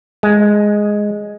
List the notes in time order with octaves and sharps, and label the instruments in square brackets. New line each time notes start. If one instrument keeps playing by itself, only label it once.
[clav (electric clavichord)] G#3